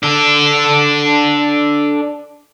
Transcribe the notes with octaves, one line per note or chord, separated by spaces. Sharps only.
D4 A4